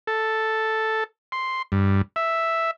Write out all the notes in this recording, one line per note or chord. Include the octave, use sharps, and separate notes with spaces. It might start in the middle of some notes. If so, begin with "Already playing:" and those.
A4
C6
G2
E5